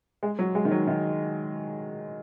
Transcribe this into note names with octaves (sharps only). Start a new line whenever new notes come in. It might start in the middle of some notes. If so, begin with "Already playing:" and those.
G#3
F#3
G#3
D#3
F#3
D#3